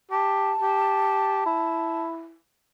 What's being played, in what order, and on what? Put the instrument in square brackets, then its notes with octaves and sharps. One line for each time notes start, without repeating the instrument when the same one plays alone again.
[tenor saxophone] G4 [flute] A5
[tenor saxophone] G4
E4